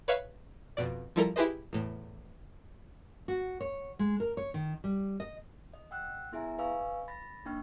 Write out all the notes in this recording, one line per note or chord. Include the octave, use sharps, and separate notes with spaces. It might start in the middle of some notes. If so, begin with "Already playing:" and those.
B4 C#5 E5 F5 B5
F2 B2 D5
F3 G3 E4 A4 A#4
E4 G4 G#4 B4 C5 D#5
E2 A2
F#4
C#5
G#3
A#4
C#5
D#3
G3
D#5
D#5
F#5 G5 E6 F#6
B3 E4 G#4 E5 G#5 A#5
B4 D#5 F5 G#5 C#6 E6
B5 A6 A#6
A#3 D4 D#4 G5 C#6 F6